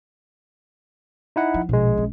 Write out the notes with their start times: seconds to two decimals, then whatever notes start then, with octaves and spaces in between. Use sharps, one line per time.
1.36 D#4 E4 F#5
1.54 F3
1.69 A#1 B2 G#3
1.97 C#4